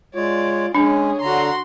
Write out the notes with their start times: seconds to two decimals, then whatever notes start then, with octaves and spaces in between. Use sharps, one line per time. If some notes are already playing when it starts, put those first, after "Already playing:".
0.15 G#3 F4 C#5 D5
0.75 G#3 C#4 D4 G#4 C#5
1.21 D3 F#4 A#5 C6